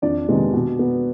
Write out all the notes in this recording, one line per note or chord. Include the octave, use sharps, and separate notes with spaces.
F2 D4 D5
C3 D#3 G#3 B3
B2
B3